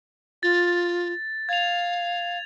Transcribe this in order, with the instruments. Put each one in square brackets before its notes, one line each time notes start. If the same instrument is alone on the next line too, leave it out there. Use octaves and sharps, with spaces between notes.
[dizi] F4 [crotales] A6
[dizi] F5 [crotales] G#6 F7